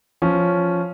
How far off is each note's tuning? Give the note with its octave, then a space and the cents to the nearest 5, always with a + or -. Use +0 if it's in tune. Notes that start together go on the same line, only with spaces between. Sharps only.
F3 +0 C#4 +0